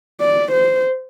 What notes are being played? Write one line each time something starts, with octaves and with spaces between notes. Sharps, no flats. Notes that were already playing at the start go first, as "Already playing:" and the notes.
D5
C5